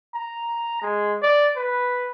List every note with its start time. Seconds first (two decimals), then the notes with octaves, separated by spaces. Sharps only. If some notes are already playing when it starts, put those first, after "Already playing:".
0.14 A#5
0.82 G#3
1.22 D5
1.56 B4